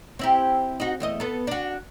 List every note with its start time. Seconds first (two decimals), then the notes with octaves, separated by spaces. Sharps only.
0.19 C4 E4 G4
0.80 D#4 F#4
1.00 E2 A3 D#5
1.20 B3 A4
1.47 D4 F#4